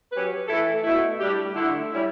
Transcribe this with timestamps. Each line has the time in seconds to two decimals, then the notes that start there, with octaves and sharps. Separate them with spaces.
0.13 F#3 C#4 G4 B4
0.48 E3 A3 E4 A4
0.84 B2 A3 E4
1.19 A2 G3 D4 G4
1.55 D3 A3 E4
1.91 G3 C#4 E4